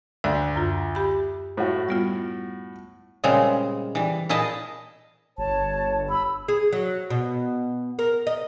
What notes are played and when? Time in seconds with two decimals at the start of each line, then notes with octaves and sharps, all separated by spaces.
0.24 D2 D5 E5 F#5
0.56 F#2 F4
0.95 G4 B5
1.57 A2 F#4
1.89 G3 B3 F4
3.24 A#2 C#3 G3 G#3 C4
3.95 E3 G3
4.29 A#2 E4 G#4 D#5 A5
5.38 G1 C#5 A5
6.09 B5 E6
6.48 G#4
6.73 F#3
7.10 B2
7.99 A#4
8.27 D#5